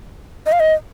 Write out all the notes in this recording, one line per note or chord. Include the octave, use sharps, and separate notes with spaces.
D#5
F5
D#5